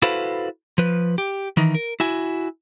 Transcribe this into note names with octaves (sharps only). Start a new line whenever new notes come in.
E4 F#4 A4 B4 C5 F5
F3 B4
G4
D#3 E3 D#4
A#4
E4 F#4 G#5